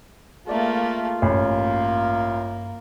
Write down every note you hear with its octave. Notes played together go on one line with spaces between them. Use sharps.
A3 A#3 F4 G#4 D5 E5
A1 G2 A#3 B5